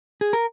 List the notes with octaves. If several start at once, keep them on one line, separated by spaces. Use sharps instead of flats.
G#4
A#4